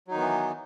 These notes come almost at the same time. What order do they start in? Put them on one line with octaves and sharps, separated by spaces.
F#3 D#4 D#3 B3 E3